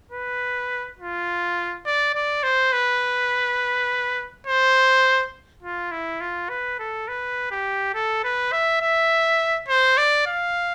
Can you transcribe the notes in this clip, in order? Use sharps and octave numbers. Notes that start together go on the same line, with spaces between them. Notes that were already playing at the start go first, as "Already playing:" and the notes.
B4
F4
D5
D5
C5
B4
C5
F4
E4
F4
B4
A4
B4
G4
A4
B4
E5
E5
C5
D5
F5